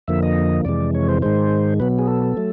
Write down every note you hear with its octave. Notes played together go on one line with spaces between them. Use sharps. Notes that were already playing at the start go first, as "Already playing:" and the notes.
F2 D3 F3 A#3 E5
D#5
F2 C3 E3 G#3 D5
C#5
C5
G#2 D#3 G#3 C5
B2 F#3 B3 B4
G#4
A4
F#3 A3